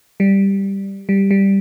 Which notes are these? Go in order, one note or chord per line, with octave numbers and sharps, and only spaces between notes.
G3
G3
G3